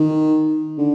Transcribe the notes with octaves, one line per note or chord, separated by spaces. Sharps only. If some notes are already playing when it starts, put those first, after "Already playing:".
Already playing: D#3
D3